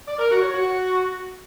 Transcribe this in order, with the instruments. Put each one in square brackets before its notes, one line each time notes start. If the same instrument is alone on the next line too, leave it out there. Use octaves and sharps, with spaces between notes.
[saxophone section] D5
A#4
F#4
C#5
F#4